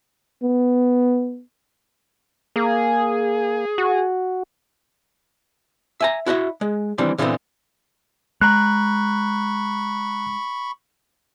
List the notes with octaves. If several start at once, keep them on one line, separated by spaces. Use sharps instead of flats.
B3
A#3 G#4
F#4
E5 G#5 A#5
E4 F#4 D#5 E5
G#3
D#3 E3 G3 C4 D4
A#2 D3 E3 G3 B3 C4
G#3 A#5 B5 C#6 F#6